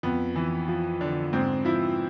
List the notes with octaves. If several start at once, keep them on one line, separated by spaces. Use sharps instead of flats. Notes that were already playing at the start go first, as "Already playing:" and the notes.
F2 B3
E3
F3
D3
G#2 C4
F3 E4